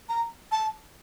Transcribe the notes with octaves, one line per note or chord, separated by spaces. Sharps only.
A#5
A5